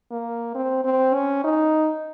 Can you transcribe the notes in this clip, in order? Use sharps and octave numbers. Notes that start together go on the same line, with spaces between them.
A#3
C4
C4
C#4
D#4